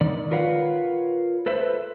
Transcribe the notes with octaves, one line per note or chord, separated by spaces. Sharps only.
D#3 D5
F4 A#4 B4 C#5 F5 F#5
A4 B4 C5 E5